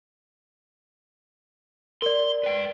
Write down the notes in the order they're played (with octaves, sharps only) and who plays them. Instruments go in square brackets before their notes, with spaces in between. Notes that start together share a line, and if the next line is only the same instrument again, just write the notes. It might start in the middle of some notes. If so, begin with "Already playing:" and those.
[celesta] A#4 D5 [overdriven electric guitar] C6
[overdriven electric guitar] B4 G5